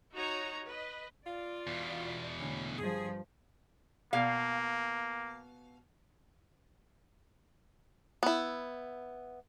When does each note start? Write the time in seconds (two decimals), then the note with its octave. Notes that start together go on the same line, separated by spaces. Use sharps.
0.12 D#4 F#4 C#5 A#5
0.66 B4 D#5
1.26 F4 D5
1.67 E2 B2
2.39 A2 D3 A3 C#4
2.78 G2 F3 G#4
4.13 B2 A#3 F5
8.23 B3 E4